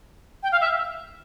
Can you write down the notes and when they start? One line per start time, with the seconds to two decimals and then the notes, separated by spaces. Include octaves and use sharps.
0.43 G5
0.52 F5
0.61 E5